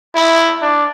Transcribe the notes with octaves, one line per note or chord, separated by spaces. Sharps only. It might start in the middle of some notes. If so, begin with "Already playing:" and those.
E4
D4